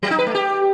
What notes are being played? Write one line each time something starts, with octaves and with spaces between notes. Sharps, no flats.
F#3
D#4
B4
A3
G4